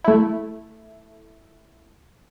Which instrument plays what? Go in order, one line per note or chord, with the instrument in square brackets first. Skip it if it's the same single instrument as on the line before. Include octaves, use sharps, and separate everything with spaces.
[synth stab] A3 E4